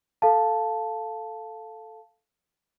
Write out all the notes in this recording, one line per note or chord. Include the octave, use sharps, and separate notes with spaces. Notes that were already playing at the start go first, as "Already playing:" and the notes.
A4 F5 A5